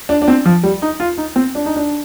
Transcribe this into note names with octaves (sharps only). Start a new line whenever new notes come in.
D4
D4
C4
F3
G3
D#4
F4
D#4
C4
D4
D#4
D4